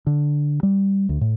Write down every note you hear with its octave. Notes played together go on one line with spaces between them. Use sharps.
D3
G3
D2
A2